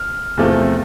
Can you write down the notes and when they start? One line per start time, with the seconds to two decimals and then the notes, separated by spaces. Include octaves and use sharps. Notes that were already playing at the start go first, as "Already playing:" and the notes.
Already playing: F6
0.37 E2 C3 F3 A3